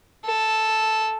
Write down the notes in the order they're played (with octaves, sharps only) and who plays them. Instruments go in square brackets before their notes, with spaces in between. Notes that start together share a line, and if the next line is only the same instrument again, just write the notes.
[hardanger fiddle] A4